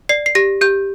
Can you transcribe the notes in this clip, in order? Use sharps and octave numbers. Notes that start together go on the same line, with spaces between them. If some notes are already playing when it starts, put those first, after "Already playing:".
D5 C7
C7
G4 A#6
G4 G6